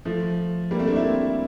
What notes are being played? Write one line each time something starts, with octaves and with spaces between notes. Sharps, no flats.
F3 A3
G3 A#3
A3 C4
A#3 D4
C4 E4